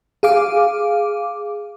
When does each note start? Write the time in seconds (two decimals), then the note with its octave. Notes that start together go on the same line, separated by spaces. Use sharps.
0.23 G#4 F5 D6